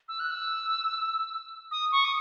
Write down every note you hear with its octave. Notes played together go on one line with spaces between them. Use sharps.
E6
F#6
E6
D#6
C#6
D#6